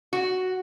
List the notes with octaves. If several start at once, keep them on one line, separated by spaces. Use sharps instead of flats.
F#4